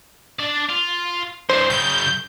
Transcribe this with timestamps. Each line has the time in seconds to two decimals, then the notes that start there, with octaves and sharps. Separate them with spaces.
0.40 D4 D5
0.70 F4
1.49 G2 E3 C5
1.70 F#2 C#3 G6